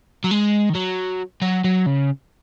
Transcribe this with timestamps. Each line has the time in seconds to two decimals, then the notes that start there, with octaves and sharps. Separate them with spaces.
0.24 F#3
0.31 G#3
0.70 D#3
0.75 F#3
1.41 F#3
1.64 F#3
1.86 C#3